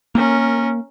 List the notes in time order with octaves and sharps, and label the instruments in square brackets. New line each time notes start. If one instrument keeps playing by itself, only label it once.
[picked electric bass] A#3 [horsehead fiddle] C#4 A#4